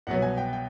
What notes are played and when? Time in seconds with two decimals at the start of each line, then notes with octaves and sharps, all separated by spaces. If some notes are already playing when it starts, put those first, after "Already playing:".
0.07 C2 B2 F#3 B3 F#5
0.22 G#5
0.38 G5
0.53 G5